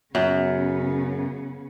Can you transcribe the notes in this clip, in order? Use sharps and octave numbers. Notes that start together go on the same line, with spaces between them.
F#2 C#3 B3